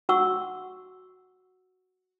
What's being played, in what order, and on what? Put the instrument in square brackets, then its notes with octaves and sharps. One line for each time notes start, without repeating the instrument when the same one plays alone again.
[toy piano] F#4 F#5 C#6 E6